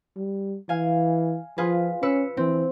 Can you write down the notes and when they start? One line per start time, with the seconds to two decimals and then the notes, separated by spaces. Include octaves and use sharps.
0.17 G3
0.69 E3 F5 G#5
1.58 F3 F4 G#4 B4
2.03 C#4 B4 E6 C#7
2.37 E3 C4